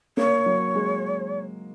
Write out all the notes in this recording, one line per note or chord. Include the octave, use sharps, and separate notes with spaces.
A#3 C#5
F#3
G#3